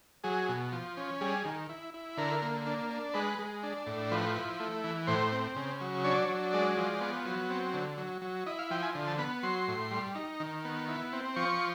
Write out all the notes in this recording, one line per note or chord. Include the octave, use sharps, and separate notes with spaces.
F#3 G#4
B2
F3
C#4
G3 G#4
D#3
E4
E4
D3 A#4
A#3
D4
D4
G#3 B4
G#3
D4
A2
F3 B4
E4
A3
E3
A2 C5
C4
C#3
F#3
D4 C#5
D5
C#5
F#3
G#3 D5
F3
B3
F#3
C4
D3
F#3
F#3
E4 D#5
F5
F3 G5
G#5
D3
A5
B3 B5
F#3 C6
A2
G3
D#4
D#3
B3
E4
C4
F3 C#6